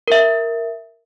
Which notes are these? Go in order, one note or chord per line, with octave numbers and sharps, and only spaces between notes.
A#4 E5